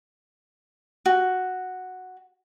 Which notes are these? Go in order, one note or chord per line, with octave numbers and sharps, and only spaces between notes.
F#4